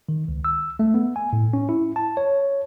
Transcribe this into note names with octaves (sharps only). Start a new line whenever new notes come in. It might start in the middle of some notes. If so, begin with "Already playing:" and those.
D#3
C#2
E6
A3
B3
G#5
A2
C#4
E4
A5
C#5